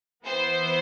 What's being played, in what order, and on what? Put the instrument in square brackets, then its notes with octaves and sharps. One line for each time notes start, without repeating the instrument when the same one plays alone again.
[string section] E3 B3 E4 C5